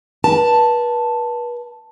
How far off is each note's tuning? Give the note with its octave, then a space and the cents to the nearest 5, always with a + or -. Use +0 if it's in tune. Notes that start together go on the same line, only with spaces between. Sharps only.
B4 -35 A5 +0